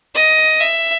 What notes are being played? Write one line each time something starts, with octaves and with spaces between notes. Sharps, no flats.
D#5
E5